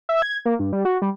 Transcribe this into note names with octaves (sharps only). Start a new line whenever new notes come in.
E5
G#6
A#3
G2
G3
F#4
G3